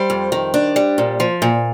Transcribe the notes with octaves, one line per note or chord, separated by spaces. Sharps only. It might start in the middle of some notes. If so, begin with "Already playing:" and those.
Already playing: G3 C5
F2
D#3
D4
G3
A#2
F3
A#2